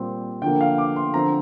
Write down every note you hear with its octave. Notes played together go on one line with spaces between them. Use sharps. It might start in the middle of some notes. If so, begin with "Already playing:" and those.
Already playing: A#2 G3 C4
D3 F3 A#3 G5
F5
D6
C6
D3 F3 C4 A#5